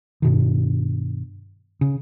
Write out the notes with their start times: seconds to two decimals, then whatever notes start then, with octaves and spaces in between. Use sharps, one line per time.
0.22 G2 B2 D#3
1.81 C#3